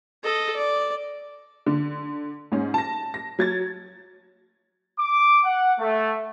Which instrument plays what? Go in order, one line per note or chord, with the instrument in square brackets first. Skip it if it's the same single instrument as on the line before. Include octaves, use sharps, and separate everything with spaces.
[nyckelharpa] A4 D#5
D5
[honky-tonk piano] D3
G#2 C#4
A5 A#6
A#6
F#3 G#6 A6
[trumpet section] D6
F#5
A3